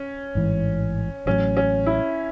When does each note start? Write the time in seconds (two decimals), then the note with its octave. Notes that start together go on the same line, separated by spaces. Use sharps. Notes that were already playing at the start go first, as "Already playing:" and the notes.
Already playing: C#4
0.35 A1 G#2 E3
1.26 A1 A2 F#3 C#4
1.57 C#4
1.86 E4